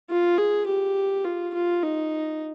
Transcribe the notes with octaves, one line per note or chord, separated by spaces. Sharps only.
F4
G#4
G4
F4
F4
D#4